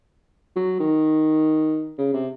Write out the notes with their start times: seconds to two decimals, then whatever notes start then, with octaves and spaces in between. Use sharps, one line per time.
0.56 F#3
0.79 D#3
1.98 C#3
2.13 C3